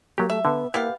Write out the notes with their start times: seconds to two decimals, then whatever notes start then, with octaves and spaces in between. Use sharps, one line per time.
0.18 F#3 A#3 G4
0.30 A3 E5
0.45 D3 B3
0.74 A#3 B3 E4 G4 F5